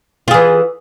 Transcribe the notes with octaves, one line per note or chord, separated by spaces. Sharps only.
E3 F4 G#4